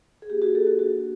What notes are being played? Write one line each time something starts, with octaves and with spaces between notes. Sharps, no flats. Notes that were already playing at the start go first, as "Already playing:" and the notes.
G#4
A#3 D4 F4 G4
F#4 G#4
G4 A4
F#4 G#4
A#3 D4 F#4